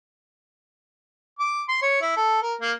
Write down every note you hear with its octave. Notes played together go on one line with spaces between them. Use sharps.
D6
C6
C#5
E4
A4
A#4
A#3